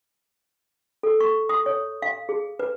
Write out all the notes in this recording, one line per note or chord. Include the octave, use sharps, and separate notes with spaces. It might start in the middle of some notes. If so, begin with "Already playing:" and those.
A4
C#6
D#6
C#5
F5
G#4
B4